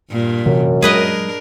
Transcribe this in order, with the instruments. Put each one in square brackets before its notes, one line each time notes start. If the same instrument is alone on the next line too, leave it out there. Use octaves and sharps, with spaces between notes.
[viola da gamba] G2 A#2
[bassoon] F#2 [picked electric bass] C3 E3
[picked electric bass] F#3 G#3 [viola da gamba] D4 A#4 [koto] G#4 B4 D#5